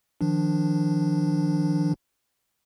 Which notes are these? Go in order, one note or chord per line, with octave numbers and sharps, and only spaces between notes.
D#3 F3 D4